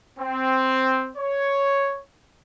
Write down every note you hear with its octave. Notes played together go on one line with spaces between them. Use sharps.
C4
C#5